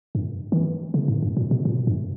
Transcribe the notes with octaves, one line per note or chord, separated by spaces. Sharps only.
G2
D#3
E3
C#3
G#2
G2
A#2
B2
A#2
G2